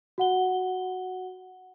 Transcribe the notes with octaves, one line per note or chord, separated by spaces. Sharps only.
F#4 F#5 G7